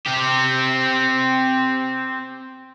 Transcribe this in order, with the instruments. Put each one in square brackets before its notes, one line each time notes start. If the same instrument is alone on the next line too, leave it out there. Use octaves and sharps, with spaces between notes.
[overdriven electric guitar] C4 G4